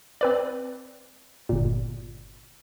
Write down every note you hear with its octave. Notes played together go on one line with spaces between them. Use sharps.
C4 B4 D5
G1 A#2